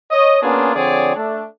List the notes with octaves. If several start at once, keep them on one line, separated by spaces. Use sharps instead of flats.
C#5 D#5
A#3 B3 C#4 D4 F4 G#4
D3 F3 C4 G#4 C#5 D5
A3 D4